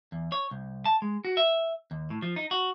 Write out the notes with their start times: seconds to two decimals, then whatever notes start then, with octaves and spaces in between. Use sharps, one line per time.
0.12 E2
0.32 C#5
0.51 C2
0.85 A5
1.02 G#3
1.25 F#4
1.37 E5
1.91 D#2
2.10 A2
2.22 F3
2.36 D#4
2.51 F#4